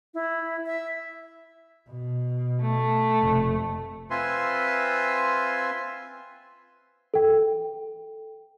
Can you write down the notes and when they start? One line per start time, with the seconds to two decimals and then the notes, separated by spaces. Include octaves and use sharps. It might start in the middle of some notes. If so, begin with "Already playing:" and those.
0.14 E4
0.66 E5
1.88 B2
2.61 A3
3.21 F1
4.10 C4 F4 B4 E5 G#5 C6
7.14 A4 G5